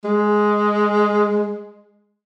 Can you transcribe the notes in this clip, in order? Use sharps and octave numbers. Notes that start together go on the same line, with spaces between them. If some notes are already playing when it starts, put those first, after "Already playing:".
G#3